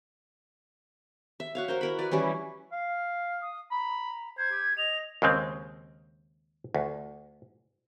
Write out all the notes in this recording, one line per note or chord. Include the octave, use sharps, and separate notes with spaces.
E5
F#4 C#5 F5
F#4 A#4 C5
E4 A#4 B5
F#4 B4 D5
E3 G3 C#4 E4
F5
D#6
A#5 B5
C5 G#6
G4
D#5 F7
D#2 C#3 G#3 C4
D2